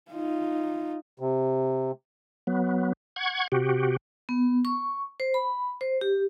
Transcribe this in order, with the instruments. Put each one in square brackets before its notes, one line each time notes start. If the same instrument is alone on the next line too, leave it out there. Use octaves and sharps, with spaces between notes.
[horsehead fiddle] D#4 F4
[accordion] C3
[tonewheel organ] F#3 B3
F#5 C#6 G#6
C3 F#4 G4
[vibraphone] B3
C#6
C5
B5
C5
G4